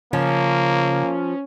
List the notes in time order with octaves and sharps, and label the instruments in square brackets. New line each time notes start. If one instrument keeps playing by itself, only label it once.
[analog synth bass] C#3 [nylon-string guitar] F3 [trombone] A#3 [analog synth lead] C#4